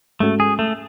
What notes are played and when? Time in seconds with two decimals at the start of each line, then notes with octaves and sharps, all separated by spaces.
0.20 G#2 G#3 A3 C#4 F#4 A4
0.40 G#4
0.59 A3